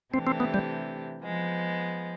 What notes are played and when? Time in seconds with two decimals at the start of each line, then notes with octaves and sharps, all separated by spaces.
0.14 C3 E3 A3 C4 D4 G4
0.27 C4
0.40 B3
0.54 G3
1.22 F3 G#3 B3